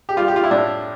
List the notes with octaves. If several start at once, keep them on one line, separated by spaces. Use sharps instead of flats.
G4
G3 F4
G4
F4
E4
A2 D4